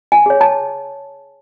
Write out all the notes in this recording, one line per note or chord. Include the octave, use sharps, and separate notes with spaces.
G#5
G#4 C#5
A5